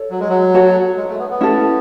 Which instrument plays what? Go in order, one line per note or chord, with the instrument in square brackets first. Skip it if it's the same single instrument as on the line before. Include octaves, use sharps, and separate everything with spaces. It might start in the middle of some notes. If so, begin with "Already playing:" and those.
Already playing: [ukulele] A4 C#5
[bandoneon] F#3
G#3
F#3
[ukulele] F#4 A4 C#5 F#5
[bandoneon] G#3
A3
B3
B3
[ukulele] C#4 E4 A4